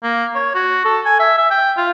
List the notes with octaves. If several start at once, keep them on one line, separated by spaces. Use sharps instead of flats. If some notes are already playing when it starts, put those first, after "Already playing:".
A#3
C#5
F#4
A4
G#5
E5
E5
G5
F4